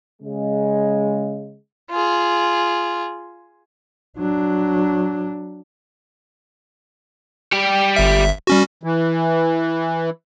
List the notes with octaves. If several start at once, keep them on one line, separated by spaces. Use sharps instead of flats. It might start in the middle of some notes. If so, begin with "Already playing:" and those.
C#3 G#3
F4 G#4
F#3 D4
G3 G4
G1 E5
G3 C#4 F#4
E3